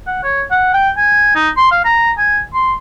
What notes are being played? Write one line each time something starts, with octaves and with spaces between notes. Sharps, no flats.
F#5
C#5
F#5
G5
G#5
D#4
C6
F5
A#5
G#5
C6